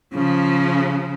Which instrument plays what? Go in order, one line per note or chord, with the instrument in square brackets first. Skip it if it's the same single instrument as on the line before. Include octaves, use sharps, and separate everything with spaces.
[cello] C#3 F3